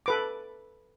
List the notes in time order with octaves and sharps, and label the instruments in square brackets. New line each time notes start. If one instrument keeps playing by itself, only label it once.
[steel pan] A4 B4 D6